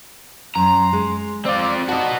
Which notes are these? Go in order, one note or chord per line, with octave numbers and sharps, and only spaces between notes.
F#2 A#5 C6
G#3
C4 F4 D5
D#4 F#4 D#5 A5